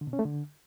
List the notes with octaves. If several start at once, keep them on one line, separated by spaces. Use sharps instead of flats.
D3
B2
C#4
A3
D3